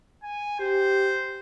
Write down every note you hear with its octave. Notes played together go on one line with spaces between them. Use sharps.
G#5
G4 C5